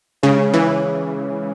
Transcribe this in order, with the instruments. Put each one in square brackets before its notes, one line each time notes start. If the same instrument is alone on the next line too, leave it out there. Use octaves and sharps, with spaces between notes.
[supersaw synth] C#3 [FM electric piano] G#3 C#4 G#4 C#5
[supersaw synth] E3